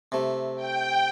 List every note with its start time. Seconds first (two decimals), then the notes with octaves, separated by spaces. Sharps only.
0.12 C3 A3
0.55 G5